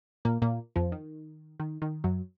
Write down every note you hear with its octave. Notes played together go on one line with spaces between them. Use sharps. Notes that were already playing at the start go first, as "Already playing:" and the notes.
A#2 A#3
A#2 A#3
F2 F3
D#3
D#3
D#3
F#2 F#3